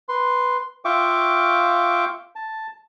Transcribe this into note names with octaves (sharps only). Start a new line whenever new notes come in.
B4 C6
F4 E5 F5 G5 C#6 D6
A5